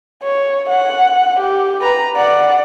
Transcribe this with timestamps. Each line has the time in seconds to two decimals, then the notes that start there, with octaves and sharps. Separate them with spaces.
0.23 C#5
0.70 F#5
1.40 G4
1.82 B4 A#5
2.16 D5 F#5